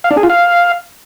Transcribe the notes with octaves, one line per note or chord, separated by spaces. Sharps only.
F5
D4
G#4
F4
F5